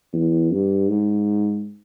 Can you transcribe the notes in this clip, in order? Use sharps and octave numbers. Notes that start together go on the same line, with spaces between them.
E2
G2
G#2